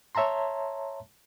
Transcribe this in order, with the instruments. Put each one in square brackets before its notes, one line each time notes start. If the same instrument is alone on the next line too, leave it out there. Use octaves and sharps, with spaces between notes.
[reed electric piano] C#5 E5 A5 A#5 C6